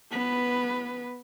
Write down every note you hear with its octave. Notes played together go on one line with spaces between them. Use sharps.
B3 B4